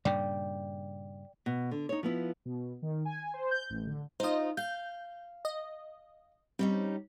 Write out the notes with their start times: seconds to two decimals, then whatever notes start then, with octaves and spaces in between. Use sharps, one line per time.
0.05 G2 A#2 C#3 D5 G5
1.46 B2
1.71 D3
1.89 D#4 C#5
2.03 F3 B3 E4
2.45 B2
2.82 D#3
3.05 G#5
3.34 C5
3.51 G6
3.70 A1
3.87 D3
4.20 D#4 F4 C5 D#5
4.57 F5 G6
5.45 D#5
6.59 G3 C4 C#4 D#4